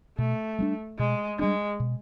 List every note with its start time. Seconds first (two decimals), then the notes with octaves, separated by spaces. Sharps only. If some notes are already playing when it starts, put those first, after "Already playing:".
0.18 B2 A3
0.59 G3 A#3 D4
0.99 B2 G#3
1.39 G3 G#3 A#3 D4
1.80 B2